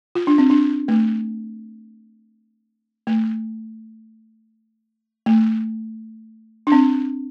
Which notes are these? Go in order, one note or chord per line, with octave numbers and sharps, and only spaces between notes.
F4
D4
C4
D4
A3
A3
A3
D4
C4